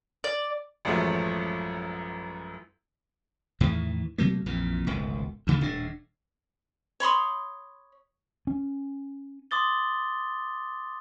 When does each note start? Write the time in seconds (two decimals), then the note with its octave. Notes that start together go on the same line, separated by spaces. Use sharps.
0.24 D5
0.85 A1 F#2 F3 F#3 G#3 A3
3.60 E2 A2 D#3 E3
4.18 B2 F#3 A3 A#3
4.46 A#1 F2 A#2 E3
4.87 D1 G#1 C#2 B2
5.47 D2 C#3 A3
5.61 D#1 A2 D4
7.00 C#5 B5 C6 D#6
8.47 C#4
9.51 C6 D6 D#6 A6 G7